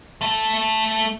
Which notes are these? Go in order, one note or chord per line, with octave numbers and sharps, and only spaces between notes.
A3 A4